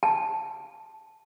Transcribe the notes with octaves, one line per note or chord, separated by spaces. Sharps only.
A5